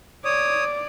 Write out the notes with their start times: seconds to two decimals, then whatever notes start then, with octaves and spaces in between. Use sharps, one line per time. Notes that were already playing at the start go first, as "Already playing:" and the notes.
0.25 C#5 D5 D#6